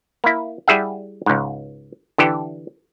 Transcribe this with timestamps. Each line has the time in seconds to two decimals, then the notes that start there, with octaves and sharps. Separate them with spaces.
0.24 A#3 E4
0.68 G3 E4 G#4 E5 F#5
1.26 C#2 G#2
2.18 D3 E3 G4 A4